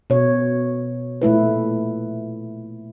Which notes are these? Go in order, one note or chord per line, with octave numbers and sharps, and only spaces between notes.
B2 C#5
A#2 A3 E4 B4